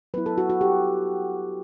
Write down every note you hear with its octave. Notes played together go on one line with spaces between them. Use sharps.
F#3 B3 E4 B4
A4
F#4
F#4
G4